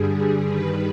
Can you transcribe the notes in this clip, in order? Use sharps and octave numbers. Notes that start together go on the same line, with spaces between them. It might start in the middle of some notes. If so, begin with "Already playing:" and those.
Already playing: G2 D3 G3 G#4
G2 D#3 G3 B4